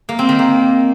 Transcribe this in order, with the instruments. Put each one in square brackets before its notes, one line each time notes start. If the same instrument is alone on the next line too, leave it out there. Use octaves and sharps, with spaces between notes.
[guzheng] A#3
C4
D#3
A#3